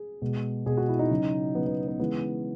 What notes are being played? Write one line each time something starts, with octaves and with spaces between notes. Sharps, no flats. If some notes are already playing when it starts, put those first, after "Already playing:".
Already playing: G#4
B2 G#3
B2 G#3 G#4
F#4
E4
D#4
C#3 F#3
C#3 F#3 B3
B3
B3
C#3 E3 G#3 B3